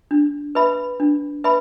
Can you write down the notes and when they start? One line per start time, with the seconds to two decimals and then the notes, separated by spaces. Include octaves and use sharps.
0.11 D4
0.55 B4 E5 B5
1.00 D4
1.44 B4 E5 B5